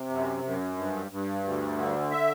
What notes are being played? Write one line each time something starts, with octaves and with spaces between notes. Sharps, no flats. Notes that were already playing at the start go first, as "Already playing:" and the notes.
Already playing: C3
F#2
F#2
G2
G2
D2
D3
E5